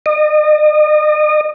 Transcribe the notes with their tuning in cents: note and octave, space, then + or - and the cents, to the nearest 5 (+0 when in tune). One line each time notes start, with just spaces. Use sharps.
D#5 -35